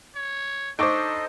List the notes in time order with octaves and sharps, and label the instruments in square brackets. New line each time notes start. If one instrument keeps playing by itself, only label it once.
[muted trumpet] C#5
[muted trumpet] D4 [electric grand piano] D#4 C5 [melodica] A4 D#5 [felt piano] C#6 D6 D7